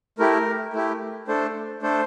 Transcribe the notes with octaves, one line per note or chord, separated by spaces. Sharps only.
A3 E4 G4 A#4
A3 E4 G4
A3 D4 A4 C5
A3 D4 A4 C5